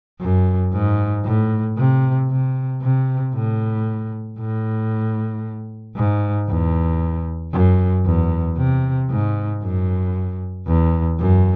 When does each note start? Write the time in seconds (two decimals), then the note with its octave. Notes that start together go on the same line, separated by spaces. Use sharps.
0.21 F#2
0.73 G#2
1.25 A2
1.78 C3
2.30 C3
2.82 C3
3.35 A2
4.39 A2
5.96 G#2
6.49 E2
7.53 F#2
8.06 E2
8.58 C3
9.10 G#2
9.63 F#2
10.67 E2
11.19 F#2